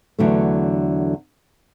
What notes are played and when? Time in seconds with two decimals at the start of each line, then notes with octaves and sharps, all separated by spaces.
0.19 E2 D3 F#3 A3